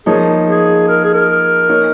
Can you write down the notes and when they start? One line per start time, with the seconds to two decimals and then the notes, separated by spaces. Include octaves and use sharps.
0.06 F3 A#3 D#4 G#4 C#5
0.48 G#4
0.88 A#4
1.04 G#4
1.14 A#4
1.69 A#3 D#4 C#5